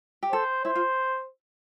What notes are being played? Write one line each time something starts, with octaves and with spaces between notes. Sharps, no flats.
G4
A4 C5
E4 C5
F4